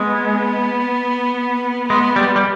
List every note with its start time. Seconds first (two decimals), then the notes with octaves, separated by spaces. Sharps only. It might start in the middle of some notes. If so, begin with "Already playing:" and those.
Already playing: G#3 B3
1.89 G#3 B3
2.16 G3
2.36 G3